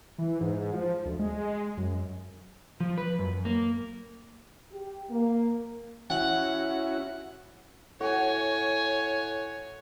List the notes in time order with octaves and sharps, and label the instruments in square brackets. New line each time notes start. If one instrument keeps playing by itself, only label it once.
[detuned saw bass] E3
G#2
F3
D2
G#3
F#2
[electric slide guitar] F3
B4
F#2
A#3
[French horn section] G4
A#3
[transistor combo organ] C#4 E4 F#4 [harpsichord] F#5
[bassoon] A2 [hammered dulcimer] F#4 [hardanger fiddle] C#5 G#5